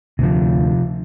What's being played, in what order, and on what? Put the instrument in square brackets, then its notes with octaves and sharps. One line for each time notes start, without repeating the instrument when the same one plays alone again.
[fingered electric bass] D2 [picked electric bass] C3 F3